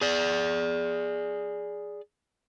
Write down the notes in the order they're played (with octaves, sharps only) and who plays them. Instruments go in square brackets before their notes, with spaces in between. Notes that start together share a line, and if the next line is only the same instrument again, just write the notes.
[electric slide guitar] G#4 D5